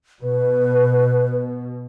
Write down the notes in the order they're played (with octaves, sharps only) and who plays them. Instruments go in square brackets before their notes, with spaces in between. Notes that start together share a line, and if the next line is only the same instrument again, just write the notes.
[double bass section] B2 [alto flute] B4